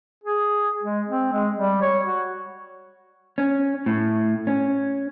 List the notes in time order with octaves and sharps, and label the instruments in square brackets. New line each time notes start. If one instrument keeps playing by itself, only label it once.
[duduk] G#4
G#3
C4
G#3
G3
C#5
F#4
[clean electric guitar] C#4
A2
C#4